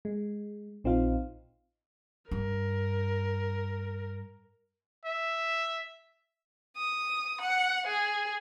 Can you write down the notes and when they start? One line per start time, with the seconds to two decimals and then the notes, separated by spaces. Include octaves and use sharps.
0.05 G#3
0.84 A#1 C4 D#4 F4 F5
2.31 G2 A#4
5.05 E5
6.78 D#6
7.41 F#5
7.87 G#4